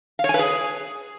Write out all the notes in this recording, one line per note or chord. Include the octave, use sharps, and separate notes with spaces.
F5
C#5
G#5
B4
G#4